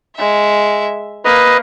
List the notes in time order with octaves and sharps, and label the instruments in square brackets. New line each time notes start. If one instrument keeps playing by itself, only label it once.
[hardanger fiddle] G#3 E5
[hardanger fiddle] A#3 [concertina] B4 D#5